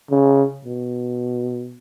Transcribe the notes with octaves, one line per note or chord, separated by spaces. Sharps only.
C#3
B2